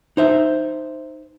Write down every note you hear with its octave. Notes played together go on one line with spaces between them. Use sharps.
D#4 C5 E5